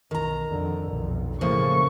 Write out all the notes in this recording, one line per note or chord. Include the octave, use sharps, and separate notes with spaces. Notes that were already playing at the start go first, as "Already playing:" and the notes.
B1 D#3 A#5
F2 D3
B1 F2
A2 C#3 F3 A#3 C#6